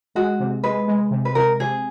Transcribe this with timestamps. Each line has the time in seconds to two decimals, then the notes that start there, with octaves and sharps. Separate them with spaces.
0.15 G#3 F#4
0.40 C3
0.63 G#3 B4
0.88 G#3
1.11 C3
1.25 B4
1.35 C3 A#4
1.60 C3 G#4